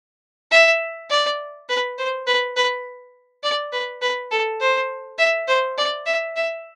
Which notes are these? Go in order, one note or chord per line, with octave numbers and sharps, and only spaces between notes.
E5
D5
B4
C5
B4
B4
D5
B4
B4
A4
C5
E5
C5
D5
E5
E5